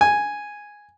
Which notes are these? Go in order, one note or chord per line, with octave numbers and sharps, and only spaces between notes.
G#5